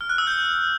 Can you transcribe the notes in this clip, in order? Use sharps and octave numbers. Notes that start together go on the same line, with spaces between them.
F6
F#6
E6
G6